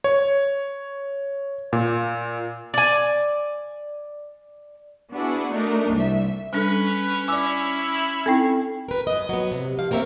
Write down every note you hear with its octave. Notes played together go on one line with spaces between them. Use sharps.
C#5
A#2
D5 G#5
B3 D4 E4 F#4 G#4
A3 D4 D#4 A#4
C2 E5
G3 C#4 D4 A4 B4
E4 D5 G#5 D6 E6
C4 D#4 E4 A4 G5
A#4 B4
F#2 D#5
F#3 B3
C3
F3 F5
E2 A#3 C4 A#4 C#5 E5